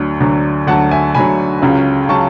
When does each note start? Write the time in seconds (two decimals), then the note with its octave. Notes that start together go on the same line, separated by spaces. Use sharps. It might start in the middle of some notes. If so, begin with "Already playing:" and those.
Already playing: D2 D3 F#3
0.20 D2 D3 F#3
0.67 D2 D3 F#3 F#5 A5
0.91 E5 G#5
1.15 D2 D3 F#3 G#5 B5
1.62 C#2 C#3 F#3
2.09 C#3 F#3 A5 C#6